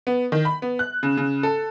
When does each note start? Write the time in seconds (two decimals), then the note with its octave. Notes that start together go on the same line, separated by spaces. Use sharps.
0.07 B3
0.32 D#3
0.45 B5
0.62 B3
0.79 F#6
1.03 C#3
1.17 C#3
1.43 A4